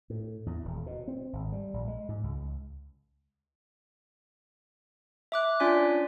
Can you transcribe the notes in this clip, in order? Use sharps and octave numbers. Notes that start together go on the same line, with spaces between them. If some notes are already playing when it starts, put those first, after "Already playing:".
A2
E2
D#1
B2
C4
G#1
G3
A#1
G#3
G#2
C#2
E5 D6 F#6
C#4 D4 F4 D5 G#5 B6